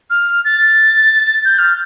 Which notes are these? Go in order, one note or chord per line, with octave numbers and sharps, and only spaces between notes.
F6
A6
G6
F6